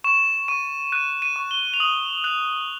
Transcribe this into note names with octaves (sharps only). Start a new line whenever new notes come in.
C#6 E7
C#6 D#7
F#6 D#7
D#7
C#6
G7
F7
D#6 F#7
F#6 F7